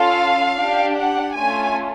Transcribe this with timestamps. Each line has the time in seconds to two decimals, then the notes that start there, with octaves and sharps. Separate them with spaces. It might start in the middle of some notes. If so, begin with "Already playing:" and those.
Already playing: C#4 F4 A4 F5
0.58 D4 G4
0.98 F#5
1.36 A3 C#4 F4 G#5